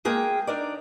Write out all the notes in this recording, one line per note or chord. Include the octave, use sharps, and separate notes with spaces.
G#3 A#3 G#4 G5
D4 D#4 A#4 D5